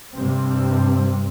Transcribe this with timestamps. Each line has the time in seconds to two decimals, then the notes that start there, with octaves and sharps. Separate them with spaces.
0.15 G2 C3 G3 C4